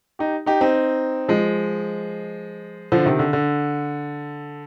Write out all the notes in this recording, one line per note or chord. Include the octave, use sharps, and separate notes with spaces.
D#4 G4
D#4 G4
C4 D#4
F3 G#3
D3 F3
C3 D#3
D3
D3